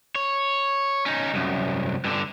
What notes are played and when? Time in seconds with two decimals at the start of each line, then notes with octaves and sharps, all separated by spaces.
0.15 C#5
1.06 C#4 D#4
1.34 C2 F#2
2.04 G2 D3